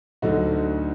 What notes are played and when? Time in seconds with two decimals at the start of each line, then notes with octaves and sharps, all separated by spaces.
0.22 D2 D3 F#3 D#4 F#4